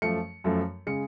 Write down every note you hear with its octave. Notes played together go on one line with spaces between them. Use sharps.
F#2 F3 A3 C#7
F#2 F3 A3
C#3 G#3 C#7